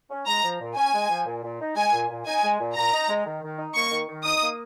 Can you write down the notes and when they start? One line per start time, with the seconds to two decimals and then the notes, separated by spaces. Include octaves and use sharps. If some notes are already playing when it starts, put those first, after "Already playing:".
0.09 C#4
0.26 G#3 A#5
0.43 F3
0.60 A#2
0.76 C#4 G#5
0.93 G#3
1.09 F3
1.26 A#2
1.43 A#2
1.59 D#4
1.76 G#3 G#5
1.92 A#2
2.09 A#2
2.26 D#4 G#5
2.42 G#3
2.59 A#2
2.75 A#2 A#5
2.92 D#4
3.09 G#3
3.25 D#3
3.42 D#3
3.58 D#4
3.74 A#3 C#6
3.91 D#3
4.07 D#3
4.24 D#4 D#6
4.41 A#3